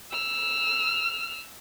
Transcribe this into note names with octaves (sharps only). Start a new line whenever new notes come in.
E6 F6